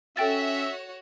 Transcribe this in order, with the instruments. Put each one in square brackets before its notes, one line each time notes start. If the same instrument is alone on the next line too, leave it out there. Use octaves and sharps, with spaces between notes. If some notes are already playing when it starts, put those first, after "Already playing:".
[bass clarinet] C#4 [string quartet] F#4 C#5 [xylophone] A4 G5 A6 [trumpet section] E5